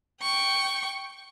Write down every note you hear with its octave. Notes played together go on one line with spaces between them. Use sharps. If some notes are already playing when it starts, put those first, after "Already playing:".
G5 C#6